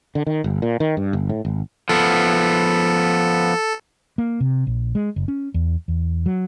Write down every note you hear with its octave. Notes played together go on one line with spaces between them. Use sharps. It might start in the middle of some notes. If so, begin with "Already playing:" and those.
D3
D#3
G1
A#2
D#3
G2
G1
A2
G#1
F3 B3 A4
A#3
C3
A#1
G#3
F#1
C#4
E2
E2
F#3